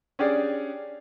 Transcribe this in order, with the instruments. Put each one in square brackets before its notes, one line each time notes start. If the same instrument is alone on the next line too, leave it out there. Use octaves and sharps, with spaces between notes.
[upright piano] C#4 D4 G4 G#4 D5